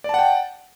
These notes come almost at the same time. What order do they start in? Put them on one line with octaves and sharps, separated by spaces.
D5 A5 F#5 G5